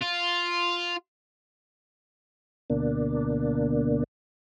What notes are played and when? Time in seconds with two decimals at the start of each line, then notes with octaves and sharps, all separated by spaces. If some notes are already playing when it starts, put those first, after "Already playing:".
0.01 F4
2.70 D2 B2 A#3 D4